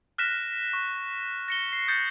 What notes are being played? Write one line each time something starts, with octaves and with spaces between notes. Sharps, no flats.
F6 F#6 A#6 B6 E7
C#6
A#6 C#7 G7
C7
D#6 G6 A6 C#7